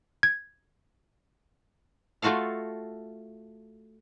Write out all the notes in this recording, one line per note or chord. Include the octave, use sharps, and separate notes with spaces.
G#6
A3 F4 F#4 A4 F5